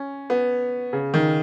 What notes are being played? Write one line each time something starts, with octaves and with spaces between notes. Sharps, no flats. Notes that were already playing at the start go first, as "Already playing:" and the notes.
Already playing: C#4
B3
C#3
D#3